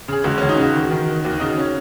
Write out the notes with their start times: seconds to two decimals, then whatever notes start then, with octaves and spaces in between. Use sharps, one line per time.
0.08 C#3 G#4
0.24 C#2 F#4
0.38 C#2 C#4
0.49 D#4
0.58 C#3 F#4
0.75 D#3
0.91 D#3
1.08 D#3
1.24 D#2 F#4
1.40 C#3 D#4
1.58 C#4